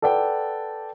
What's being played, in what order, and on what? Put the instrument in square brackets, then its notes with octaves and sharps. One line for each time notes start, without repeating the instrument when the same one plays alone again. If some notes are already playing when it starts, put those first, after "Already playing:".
[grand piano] A4 B4 D5 F#5 G5